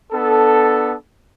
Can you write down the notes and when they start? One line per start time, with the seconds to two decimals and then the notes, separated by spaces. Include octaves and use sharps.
0.12 B3 D4 A4